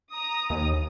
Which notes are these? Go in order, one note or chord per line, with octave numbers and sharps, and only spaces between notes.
A#5 D#6
D#2